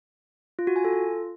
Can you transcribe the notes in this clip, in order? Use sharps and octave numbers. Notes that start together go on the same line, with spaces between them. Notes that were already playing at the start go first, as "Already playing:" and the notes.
F4
F#4
G#5
A4
F4